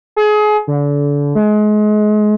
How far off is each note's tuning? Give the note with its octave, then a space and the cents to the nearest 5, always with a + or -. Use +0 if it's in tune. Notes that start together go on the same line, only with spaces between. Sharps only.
G#4 +30
D3 -30
G#3 +30